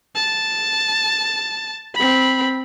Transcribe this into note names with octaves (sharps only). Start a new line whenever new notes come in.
A5
C4 B5